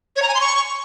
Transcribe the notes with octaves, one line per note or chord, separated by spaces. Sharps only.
C#5
A#5
G#5
C6
C#6